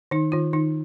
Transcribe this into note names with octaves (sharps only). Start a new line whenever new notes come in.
D#3 D#4
D#3 F4
D#3 D#4